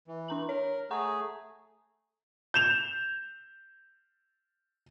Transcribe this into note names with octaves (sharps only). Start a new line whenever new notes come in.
E3
D4 A#5 F#7
A#4 C#5
A3 G#4 F#5 A#5 C#6
G6 E7 F7